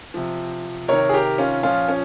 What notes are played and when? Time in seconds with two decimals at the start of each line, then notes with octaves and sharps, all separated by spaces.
0.14 C3 F3
0.88 C3 D#3 A#4 C#5
1.09 G#4
1.14 G4 A#4
1.38 C#4 F4
1.63 A#2 F3 C#4 F4
1.88 C#4